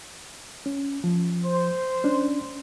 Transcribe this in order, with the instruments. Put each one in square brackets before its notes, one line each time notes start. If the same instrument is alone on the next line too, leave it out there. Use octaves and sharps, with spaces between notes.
[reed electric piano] C#4
F3
[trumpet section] C5
[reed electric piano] C#4 D4